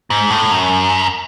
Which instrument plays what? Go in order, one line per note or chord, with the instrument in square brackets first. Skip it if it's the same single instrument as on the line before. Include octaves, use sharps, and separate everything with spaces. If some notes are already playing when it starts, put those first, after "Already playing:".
[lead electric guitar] G#2
A2
F#2